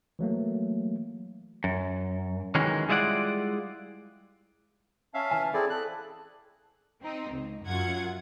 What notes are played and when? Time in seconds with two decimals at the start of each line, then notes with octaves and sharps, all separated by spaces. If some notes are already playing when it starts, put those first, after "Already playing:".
0.19 E3 F#3 A3 A#3
1.64 F#2
2.55 D#3 E3 F#3 G#3 C#4
2.89 G3 G#3 E4 F4 D5 F#5
5.14 C#4 E5 F5 A5
5.31 E3 G#5
5.54 C4 E4 G#4 A4 D5 D#6
5.70 A5 F#6
7.01 C4 D#4
7.32 C#2
7.64 F#2 F4 F#5 G#6